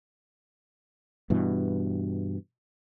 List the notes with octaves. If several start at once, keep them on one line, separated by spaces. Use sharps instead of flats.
G2 B2 E3